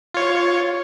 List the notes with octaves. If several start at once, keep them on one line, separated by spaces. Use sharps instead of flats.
F4 C#5